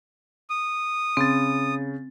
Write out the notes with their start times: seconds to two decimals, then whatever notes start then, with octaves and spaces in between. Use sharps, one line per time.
0.50 D#6
1.17 C#3 C4 A6